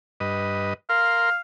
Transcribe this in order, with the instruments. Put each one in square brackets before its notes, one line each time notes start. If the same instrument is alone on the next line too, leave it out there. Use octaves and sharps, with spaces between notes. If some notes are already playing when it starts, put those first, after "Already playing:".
[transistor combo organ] G2 B4 D#5
[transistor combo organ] A#4 C6 [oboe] F5